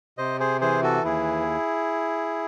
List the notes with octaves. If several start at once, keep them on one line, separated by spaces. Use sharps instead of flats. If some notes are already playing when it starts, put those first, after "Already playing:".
C3 C5 D#5
G#4 C5
E3 G#4 C5
F#4 A4
D#2 E4 G#4